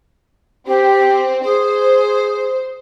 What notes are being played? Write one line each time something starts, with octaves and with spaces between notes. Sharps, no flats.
C4 G4
G#4 C5